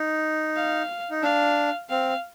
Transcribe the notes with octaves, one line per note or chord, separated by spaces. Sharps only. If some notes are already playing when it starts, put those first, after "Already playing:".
Already playing: D#4
F5
D#4
D4 F5
C4 F5